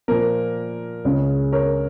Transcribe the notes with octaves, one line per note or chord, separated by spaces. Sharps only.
A#2 F3 A#3 A#4
C#2 C#3 G#3 C#4
A#4 C#5